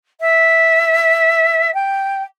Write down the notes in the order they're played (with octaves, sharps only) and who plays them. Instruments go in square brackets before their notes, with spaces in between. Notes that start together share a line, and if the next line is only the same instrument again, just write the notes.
[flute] E5
G5